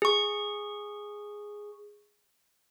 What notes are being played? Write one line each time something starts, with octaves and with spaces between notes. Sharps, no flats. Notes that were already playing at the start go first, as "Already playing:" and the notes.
G#4 C#6